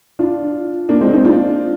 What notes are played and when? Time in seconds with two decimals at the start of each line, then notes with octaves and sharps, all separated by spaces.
0.19 D4 F4
0.89 A#3 D4
1.01 G#3 C4
1.13 C4 D#4
1.25 D4 F4